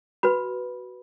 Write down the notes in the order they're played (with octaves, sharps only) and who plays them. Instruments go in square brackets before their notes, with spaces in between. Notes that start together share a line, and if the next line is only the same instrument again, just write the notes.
[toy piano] F#4 B4 B5